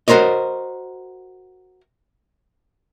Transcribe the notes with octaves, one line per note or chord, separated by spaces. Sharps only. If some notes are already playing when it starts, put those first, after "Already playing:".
F#4 A#4 C5 C#5 D#5